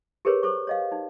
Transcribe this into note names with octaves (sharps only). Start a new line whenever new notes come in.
G4 G#4 A#4 B4 C#5
A4 C5 C#6
C#5 D#5 F5
D#4